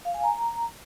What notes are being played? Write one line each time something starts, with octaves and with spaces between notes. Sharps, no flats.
F5
G#5
A#5